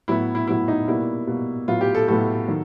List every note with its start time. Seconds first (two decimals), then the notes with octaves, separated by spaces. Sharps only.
0.08 A2 F#3 B3 E4
0.35 E4
0.47 A2 F#3 B3 E4
0.68 D#4
0.87 B2 G3 A#3 E4
1.27 B2 G3 A#3
1.68 A2 F#3 B3 F4
1.81 G4
1.95 A4
2.08 A2 F#3 B3 A4
2.48 D#3 F#3